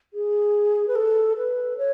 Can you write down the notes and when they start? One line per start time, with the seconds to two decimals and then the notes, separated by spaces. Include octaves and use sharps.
0.14 G#4
0.88 B4
0.95 A4
1.37 B4
1.78 C#5